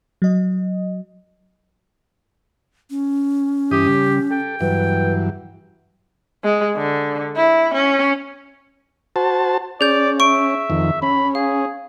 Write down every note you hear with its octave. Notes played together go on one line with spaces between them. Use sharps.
F#3 D#5
C#4
G2 E3 G4 D#6
C#3 G3
A4 G5
G2 E3 F#3 B4
G#3
D3
E4
C#4
F#4 C5 A5
C#4 G#4 D5 G6
E5 C#6 D7
F2 D#3
C#4 B5
G#4 F5